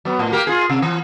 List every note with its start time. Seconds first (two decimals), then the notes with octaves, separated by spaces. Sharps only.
0.05 F#3 B3
0.19 A2
0.32 A#3 G4 A#4
0.47 F4 G#4
0.70 C3
0.82 E3